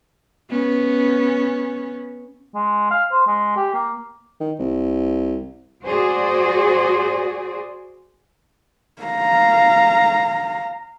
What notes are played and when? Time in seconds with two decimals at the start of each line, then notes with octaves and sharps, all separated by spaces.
0.50 B3 C#4
2.55 G#3
2.91 F5
3.12 C5
3.27 G#3
3.57 G4
3.74 A#3
4.40 D#3
4.59 C2
5.84 F#4 G#4 C5 D5
9.02 F5 A#5